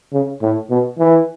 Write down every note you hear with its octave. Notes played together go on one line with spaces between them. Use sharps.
C#3
A2
B2
E3